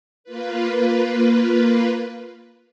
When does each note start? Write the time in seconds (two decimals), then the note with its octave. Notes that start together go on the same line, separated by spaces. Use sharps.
0.24 A#3 F4 B4